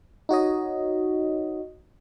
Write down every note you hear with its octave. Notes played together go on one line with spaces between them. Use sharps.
D#4 F#4 C#5 D#5